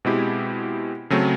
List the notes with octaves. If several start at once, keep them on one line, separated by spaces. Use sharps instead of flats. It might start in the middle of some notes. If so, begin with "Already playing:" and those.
B2 G#3 C4 E4 G4
C#3 F#3 A3 C4